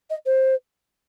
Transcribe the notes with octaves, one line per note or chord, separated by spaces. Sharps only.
D#5
C5